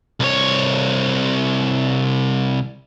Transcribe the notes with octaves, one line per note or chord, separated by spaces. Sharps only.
C2 C#5